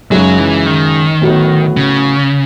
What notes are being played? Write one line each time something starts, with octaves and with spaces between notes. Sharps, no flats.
F#2 C#3 F#3 G#3 D#4
E3
D#3
A2 F#3 B3 F#4
C#3